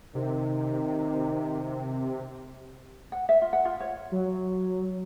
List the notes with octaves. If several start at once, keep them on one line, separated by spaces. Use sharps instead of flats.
C3 D#3
F#5
E5
F4
F#5
F4
C#5
F#3